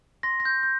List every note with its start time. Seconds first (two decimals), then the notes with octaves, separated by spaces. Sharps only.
0.23 C6 A#6
0.40 A#6
0.45 G6
0.63 G6